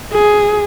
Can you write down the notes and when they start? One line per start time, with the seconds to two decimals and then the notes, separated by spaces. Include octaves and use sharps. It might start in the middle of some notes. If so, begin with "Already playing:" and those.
0.13 G#4